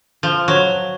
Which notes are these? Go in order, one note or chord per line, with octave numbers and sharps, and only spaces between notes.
F3
F#3